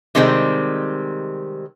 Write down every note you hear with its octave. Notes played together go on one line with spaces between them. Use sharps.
C3 D#3 G3 G#3 B3 C4